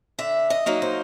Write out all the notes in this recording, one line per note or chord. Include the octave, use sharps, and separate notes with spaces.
D3 E5
D#5
F#3 A#3 D#4
C5